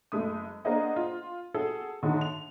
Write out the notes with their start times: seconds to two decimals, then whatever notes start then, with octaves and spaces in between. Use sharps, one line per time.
0.12 F#1 G#3 A3 D#6
0.65 A#3 D4 G#4 C5 D#5 F#5
0.96 F4
1.54 F#4 G#4 A4
2.03 A2 D3 D#3 D#4 G#4
2.21 F7